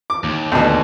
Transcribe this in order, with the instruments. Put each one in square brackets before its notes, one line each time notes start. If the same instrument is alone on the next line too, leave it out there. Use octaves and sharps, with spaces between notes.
[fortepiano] D6
[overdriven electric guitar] D#2
[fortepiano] D2 B2